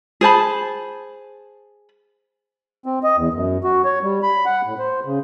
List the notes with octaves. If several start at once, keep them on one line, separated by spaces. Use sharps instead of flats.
G#4 C5 A5 B5
C4
D#5
E2
F#2
F#4
C#5
G3
B5
F#5
A2
C5
C#3